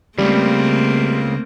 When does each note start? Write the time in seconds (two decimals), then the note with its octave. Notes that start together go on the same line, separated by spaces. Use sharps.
0.18 C#2 C#3 G3 A3 A#3 C4